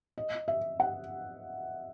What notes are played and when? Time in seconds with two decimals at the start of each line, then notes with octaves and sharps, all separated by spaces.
0.18 D#5
0.48 E5
0.80 F#5